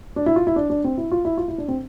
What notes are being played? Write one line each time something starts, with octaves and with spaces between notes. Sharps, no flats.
D4
E4
F4
E4
D4
D4
C4
E4
F4
E4
F4
E4
D4
C4